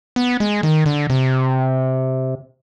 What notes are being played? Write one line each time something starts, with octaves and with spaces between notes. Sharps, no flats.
B3
G#3
D#3
D3
C3